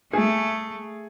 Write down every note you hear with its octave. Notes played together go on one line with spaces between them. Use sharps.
A3 G#4